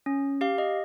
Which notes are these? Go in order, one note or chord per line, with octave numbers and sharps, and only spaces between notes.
C#4
G4 F5
D#5